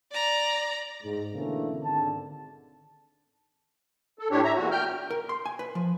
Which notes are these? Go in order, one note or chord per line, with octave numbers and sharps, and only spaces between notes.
D5 A#5
G#2
B2 D3 E3 A3 A#3 C#4
G#1 D3 A5
A4
A2 D4 G4 C#5
E5 A#5
E2 A#2 F#4
G5 F6 G6
A#4
C6
G#5
B4
F3